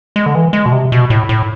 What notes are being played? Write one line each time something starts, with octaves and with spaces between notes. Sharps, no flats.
G#3
D3
E3
G#3
B2
C3
B2
A2
A2